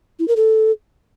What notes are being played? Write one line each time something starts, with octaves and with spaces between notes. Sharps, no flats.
E4
A#4
A4